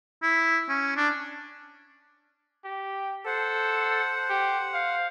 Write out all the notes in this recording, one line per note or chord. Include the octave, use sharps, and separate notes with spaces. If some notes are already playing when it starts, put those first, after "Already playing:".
E4
C#4
D4
G4
A4 C5 F#5
G4
F5